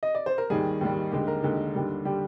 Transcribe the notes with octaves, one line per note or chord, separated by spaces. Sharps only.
D#5
D5
C5
A#4
D#2 D#3 G3 G#4
D#2 D#3 G3
D#2 D3 G#3 G4
A#4
D#2 D3 G#3
D#2 D3 G3
D3 G3 G4